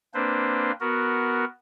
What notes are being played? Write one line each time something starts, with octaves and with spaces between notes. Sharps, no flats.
A#3 C4 D4 B4 C5
B3 F#4 A#4